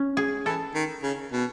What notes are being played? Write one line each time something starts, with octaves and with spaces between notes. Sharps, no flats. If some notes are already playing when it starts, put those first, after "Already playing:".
Already playing: C#4
G#4
E3 A4
D#3
C#3
B2